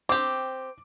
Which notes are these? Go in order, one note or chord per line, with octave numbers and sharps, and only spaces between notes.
C4 G4 D6